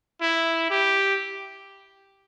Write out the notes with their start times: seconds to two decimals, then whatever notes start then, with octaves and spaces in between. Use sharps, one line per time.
0.21 E4
0.70 G4